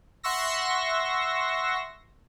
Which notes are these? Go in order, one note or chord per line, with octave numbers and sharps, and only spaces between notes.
E5 F#5 C6 C#6 E6 A#6